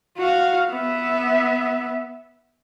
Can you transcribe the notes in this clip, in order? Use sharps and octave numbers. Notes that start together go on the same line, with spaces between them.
F#4 F5
B3 E5